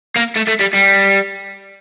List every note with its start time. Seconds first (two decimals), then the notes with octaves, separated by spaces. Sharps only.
0.17 A#3
0.37 A3
0.48 A3
0.61 G3
0.74 G3